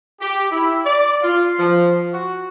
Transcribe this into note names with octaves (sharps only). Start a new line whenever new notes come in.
G4
E4
D5
F4
F3
F#4